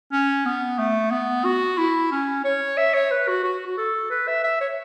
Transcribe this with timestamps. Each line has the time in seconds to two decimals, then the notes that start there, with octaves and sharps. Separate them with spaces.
0.12 C#4
0.45 B3
0.79 A3
1.11 B3
1.45 F#4
1.78 E4
2.12 C#4
2.45 C#5
2.78 E5
2.94 C#5
3.11 B4
3.28 F#4
3.44 F#4
3.66 F#4
3.77 A4
4.10 B4
4.28 E5
4.43 E5
4.61 C#5